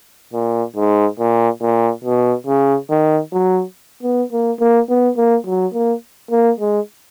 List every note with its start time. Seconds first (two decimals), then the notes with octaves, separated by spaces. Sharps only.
0.33 A#2
0.76 G#2
1.19 A#2
1.61 A#2
2.04 B2
2.47 C#3
2.90 D#3
3.33 F#3
4.03 B3
4.32 A#3
4.60 A#3
4.89 B3
5.17 A#3
5.46 F#3
5.74 A#3
6.31 A#3
6.60 G#3